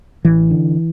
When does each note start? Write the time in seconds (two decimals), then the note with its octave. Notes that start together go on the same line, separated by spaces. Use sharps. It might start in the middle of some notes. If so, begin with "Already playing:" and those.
0.25 A1 E3
0.50 D3